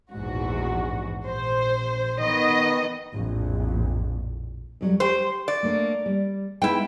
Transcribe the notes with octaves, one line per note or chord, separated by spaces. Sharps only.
A#1 E2 G#2 F#4
A#1 C5
D#3 B3 D#5
A#1 F2 A2
F2 F#3 G3
G4 C5 G5
D5
A3 A#3 D4
G3
G#3 B3 D#4 E4 G5